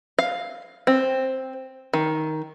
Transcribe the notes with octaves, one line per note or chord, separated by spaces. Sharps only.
F5
C4
D#3